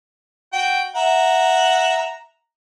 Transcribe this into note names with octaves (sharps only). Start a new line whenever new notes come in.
F#4 G5
E5 F#5 A#5